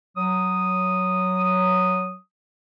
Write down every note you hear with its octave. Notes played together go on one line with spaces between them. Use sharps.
F#3 D#6